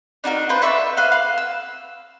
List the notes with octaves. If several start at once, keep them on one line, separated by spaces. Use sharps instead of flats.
D4 D#4 F#4 A#4
F4 B4 C5 A5
D5 E5 B5 C#6
B4 C5 F5 F#5
F5
E6